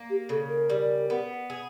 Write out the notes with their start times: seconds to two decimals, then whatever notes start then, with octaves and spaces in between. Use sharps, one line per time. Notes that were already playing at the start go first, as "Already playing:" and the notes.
Already playing: A#3
0.10 G4
0.29 C#3 A4
0.49 A#4
0.70 G3
1.10 B3
1.50 G#4